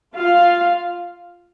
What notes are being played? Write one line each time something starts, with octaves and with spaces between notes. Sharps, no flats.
F4 F5